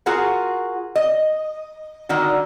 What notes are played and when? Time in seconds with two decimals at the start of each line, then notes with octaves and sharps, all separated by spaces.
0.06 F4 F#4 G#4 A#4 F#5
0.96 D#5
2.09 D3 D#3 D4 F#4